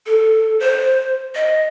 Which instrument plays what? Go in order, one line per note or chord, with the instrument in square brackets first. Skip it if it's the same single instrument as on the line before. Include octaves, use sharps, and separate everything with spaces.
[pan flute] A4
C5
D#5